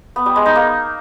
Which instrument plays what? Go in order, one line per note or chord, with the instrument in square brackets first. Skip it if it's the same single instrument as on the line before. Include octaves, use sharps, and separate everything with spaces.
[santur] B3
G3
G#3
D#4
A#3